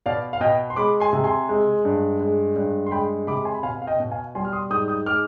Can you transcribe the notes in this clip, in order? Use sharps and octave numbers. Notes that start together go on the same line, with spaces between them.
B2 D5 F5
F5
B2 D#5 G5
C6
G#3 B5 D6
G#5 C6
C3
G#5 C6
G#3
G2
G#3
G2
C6
G#3 G5 B5
C3 B5 D6
G#5 C6
B5
B2 F5 G#5
F5
D#5 G5
B2
F5 G#5
G3 G#5 C6
F6
C6 D#6
G#2 D#6 G6
D#6 G6
G#3 D6 F6